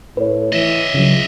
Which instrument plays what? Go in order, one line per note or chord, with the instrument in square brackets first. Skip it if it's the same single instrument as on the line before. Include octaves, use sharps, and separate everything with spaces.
[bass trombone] A2 [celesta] B4 C#5
[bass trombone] E3 [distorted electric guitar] D#5 E5
[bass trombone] C#2 [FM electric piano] C#3 F#3